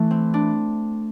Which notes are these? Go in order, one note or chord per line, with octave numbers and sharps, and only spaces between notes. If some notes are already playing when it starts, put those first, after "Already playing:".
Already playing: E3 A3
C4
D4